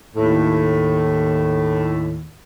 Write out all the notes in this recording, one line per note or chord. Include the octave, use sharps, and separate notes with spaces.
D#2 A2